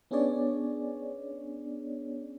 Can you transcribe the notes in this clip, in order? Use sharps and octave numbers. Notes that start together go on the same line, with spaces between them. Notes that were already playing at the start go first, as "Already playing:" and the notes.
B3 C#4 D4 G#4 C#5 D5